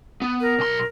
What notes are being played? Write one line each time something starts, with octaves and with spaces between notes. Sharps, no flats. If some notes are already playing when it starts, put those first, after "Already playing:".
B3
A#4
B1 C6